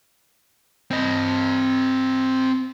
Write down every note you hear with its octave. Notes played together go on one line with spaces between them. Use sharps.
C4 D#5